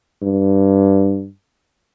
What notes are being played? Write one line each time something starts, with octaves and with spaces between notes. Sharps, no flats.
G2